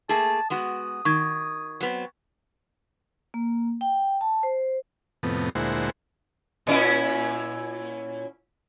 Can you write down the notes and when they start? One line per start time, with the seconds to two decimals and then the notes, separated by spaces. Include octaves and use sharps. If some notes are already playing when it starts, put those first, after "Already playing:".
0.09 A3 A#3 G#4 A5
0.50 G#3 B3 F#4 D#6
1.05 D#3 C#6 G#6
1.81 F#3 B3 C4
3.34 A#3
3.81 G5
4.21 A5
4.43 C5
5.23 F2 A2 C3 B3
5.55 D2 A#2 G#3 E4 C5 F#5
6.67 A#2 C#4 E4